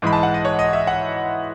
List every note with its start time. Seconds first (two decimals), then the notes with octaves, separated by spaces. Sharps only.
0.02 G#2 E3 G#3 B5
0.13 A5
0.23 F#5
0.34 D#5
0.45 C#5
0.59 D#5
0.73 E5
0.87 F#5